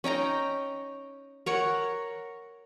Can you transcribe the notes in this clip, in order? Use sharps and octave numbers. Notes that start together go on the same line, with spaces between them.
C#4 D#4 G5 A#5
A#4 C#5 F#5